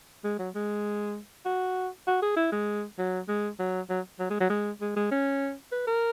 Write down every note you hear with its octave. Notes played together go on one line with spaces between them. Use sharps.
G#3
F#3
G#3
F#4
F#4
G#4
E4
G#3
F#3
G#3
F#3
F#3
F#3
G#3
F#3
G#3
G#3
G#3
C#4
B4
A#4